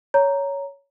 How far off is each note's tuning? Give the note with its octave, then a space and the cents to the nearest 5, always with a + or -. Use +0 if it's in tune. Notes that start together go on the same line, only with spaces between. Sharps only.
C#5 +10 A#5 +0